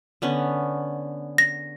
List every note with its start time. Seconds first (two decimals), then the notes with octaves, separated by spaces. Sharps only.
0.22 D3 B3 C#4
1.38 A#6